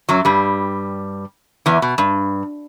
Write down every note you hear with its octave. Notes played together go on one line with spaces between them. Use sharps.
F#2 F#3
G2 G3
E2 E3
B2
G2